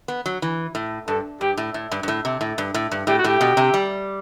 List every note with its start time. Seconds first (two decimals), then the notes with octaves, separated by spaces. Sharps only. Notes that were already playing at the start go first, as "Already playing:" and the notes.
0.08 B3
0.26 F#3
0.42 E3
0.75 A2
1.08 G2 A4
1.41 G2 G4
1.57 A2
1.74 A2
1.92 G2
2.03 G2
2.08 A2
2.25 C3
2.41 A2
2.58 G2
2.74 A2
2.92 G2
3.07 A2 G4
3.18 F#4
3.24 A2 G4
3.41 B2
3.57 C3
3.74 G3